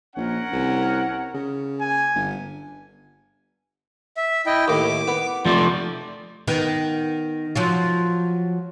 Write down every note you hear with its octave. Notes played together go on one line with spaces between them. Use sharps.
A#1 C#4 A#4 F#5
C2
C#3
A#3 G#5
G1
E5
E4 D#5 G5
D#2 A2 D6
B3
F3 A3 D5
D#3 B3
F3 F#3 F4